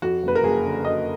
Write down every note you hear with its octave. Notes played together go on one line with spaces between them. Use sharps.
F2 F#4
F#1 B4
A#4
F#1 G#4
D3
D3 D#5